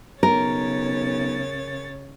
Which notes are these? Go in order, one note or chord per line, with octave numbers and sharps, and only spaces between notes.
B1 C#3 A#4 C#5 A6